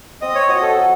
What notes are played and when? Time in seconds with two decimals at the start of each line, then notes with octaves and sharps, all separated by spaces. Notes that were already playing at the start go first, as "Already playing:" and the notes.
0.22 C4 D#5
0.35 C#5
0.49 F#4 D#5
0.62 A4
0.77 F#3